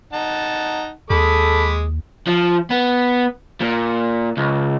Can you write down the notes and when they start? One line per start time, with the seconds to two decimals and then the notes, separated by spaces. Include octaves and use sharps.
0.13 D#4 F#5 A5
1.10 D#2 G#3 A4 B5 D6 D#6
2.27 F3
2.70 B3
3.61 A#2
4.37 C#2